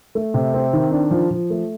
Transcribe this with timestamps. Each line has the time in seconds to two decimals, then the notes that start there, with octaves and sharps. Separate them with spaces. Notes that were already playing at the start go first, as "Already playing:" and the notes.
0.15 A3
0.34 C3
0.54 C4
0.73 D#3
0.92 D4
1.11 F3
1.31 F3
1.50 A3